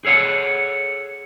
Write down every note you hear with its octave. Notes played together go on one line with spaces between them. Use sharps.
G#4 A4 C#5 F5 F#5